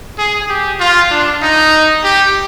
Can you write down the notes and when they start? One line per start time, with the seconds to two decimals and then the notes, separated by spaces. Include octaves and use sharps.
0.18 G#4
0.49 G4
0.80 F4
1.11 D4
1.42 D#4
2.04 G4